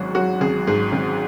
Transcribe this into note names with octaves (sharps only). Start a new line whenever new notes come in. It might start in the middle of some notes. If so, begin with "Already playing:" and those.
Already playing: G#1 G#2 F#3 F#4 G#4
F#3 F#4
G#1 G#4
G#2 G#4
G#1